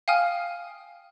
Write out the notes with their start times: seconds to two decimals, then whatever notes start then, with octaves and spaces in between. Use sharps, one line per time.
0.08 F5 G5 G#5 D#6 F6